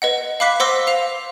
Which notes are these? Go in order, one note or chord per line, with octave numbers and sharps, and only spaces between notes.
B4 D#5 F#5
F5 B5 D6 F#6 B6
C5 F#5 C6 D6 E6 A#6
F5 F7